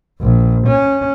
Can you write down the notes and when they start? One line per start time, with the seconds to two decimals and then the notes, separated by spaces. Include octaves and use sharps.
0.21 A#1
0.67 C#4